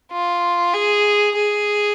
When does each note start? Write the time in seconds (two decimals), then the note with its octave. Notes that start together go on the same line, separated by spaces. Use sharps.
0.12 F4
0.74 G#4
1.36 G#4